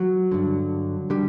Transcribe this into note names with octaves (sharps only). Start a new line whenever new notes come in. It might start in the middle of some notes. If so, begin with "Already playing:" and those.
Already playing: F#3
G2 D3
D3 G3